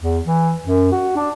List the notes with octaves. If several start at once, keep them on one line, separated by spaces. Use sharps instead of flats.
E2
E3
F#2
F#4
D4